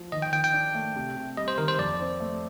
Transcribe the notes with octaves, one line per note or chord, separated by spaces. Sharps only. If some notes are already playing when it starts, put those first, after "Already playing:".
Already playing: F3
D#3 D#5
G5
D#3 G5
G5
D4
A3
C3
C3
G3 D#5
C5
D#3 A#4
C5
F2 D5
C4
A3